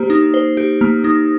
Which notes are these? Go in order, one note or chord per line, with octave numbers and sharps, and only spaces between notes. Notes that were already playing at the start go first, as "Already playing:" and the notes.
Already playing: A#3 G4 C5
D#4
C5
G4
A#3
D#4